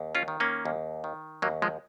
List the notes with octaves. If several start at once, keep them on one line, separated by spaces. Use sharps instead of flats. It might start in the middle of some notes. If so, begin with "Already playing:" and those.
Already playing: D#2
C#4 F4
D#3
A#3 C#4
D#2
D#3
D#2 F#3 A#3
F3 G#3